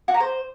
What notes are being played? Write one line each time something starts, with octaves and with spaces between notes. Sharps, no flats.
F#4
A#5
C5